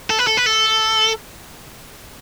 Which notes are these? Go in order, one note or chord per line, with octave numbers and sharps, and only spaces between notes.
A4
B4
A4
B4
A4